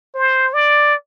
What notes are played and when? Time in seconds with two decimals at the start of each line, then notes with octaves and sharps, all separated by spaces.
0.15 C5
0.54 D5